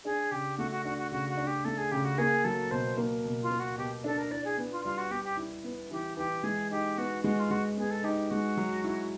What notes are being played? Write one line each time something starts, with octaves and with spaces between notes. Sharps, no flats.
D4 G#4
C#3 G4
A3 F#4
F#4
D4 F#4
F#4
C#3 F#4
F#4
D4
G4
A3 A4
G#4
C#3 G4
F#4
A#3 G#4
F#3 A4
B2 C5
A#3
B2
F4
A#3
F#4
B2 G4
D4 A4
A#4
E4 D5
G#4
B3
F4
G3 F4
F#4
B3 G4
G4
E4
B3
E3 G4
E3 G4
G#3 G#4
D#4 G4
B3 F#4
G#3 F#4
F4
G#3 F#4
B3 G#4
A4
D#4 G4
G#3 F#4
F#3
E4